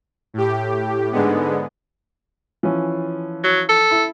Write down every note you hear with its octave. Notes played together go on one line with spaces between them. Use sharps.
A2 G4
G#2 D3 G#3 B3
E3 F3 C#4
F#3
A4
E4